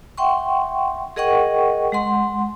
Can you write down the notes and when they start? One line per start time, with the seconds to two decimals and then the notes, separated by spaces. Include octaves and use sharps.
0.18 E5 F#5 G5 C6 C#6
1.16 G#4 A#4 D#5 F#5 G5 C#6
1.92 G#3 F#5 C6